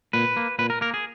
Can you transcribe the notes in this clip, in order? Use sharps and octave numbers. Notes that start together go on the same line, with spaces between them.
A#2 B4
A#3
A#2 B4
A#4
A#3 A#4
G#4